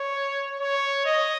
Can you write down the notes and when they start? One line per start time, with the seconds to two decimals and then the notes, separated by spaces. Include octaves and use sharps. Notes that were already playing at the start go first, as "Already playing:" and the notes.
Already playing: C#5
0.60 C#5
1.06 D#5